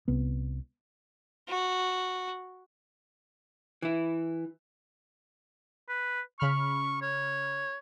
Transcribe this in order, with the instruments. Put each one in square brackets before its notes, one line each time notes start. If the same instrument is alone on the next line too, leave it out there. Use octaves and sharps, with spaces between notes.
[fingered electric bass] C2 B3
[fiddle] F#4
[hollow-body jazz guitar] E3 E4
[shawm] B4
[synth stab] C#3 B5 F6 [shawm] C#6
[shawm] C#5